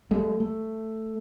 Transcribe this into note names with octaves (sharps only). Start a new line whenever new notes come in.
G3 A3
A3